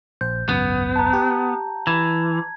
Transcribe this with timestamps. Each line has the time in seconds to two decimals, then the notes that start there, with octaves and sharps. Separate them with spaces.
0.21 A#1 C5 G6
0.49 G#1 C#2 F#2 B3
0.96 A5 A#5
1.13 G4
1.87 E3 G#6